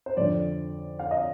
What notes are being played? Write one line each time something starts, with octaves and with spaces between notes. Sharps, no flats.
C5
F2 D3 D5
F5
D#5